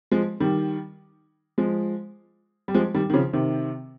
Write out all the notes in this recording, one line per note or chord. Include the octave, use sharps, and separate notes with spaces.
F3 G#3
D#3 G3
F3 G#3
G3
F3 G#3
D#3 G3
D#3
C#3 F3
C3 D#3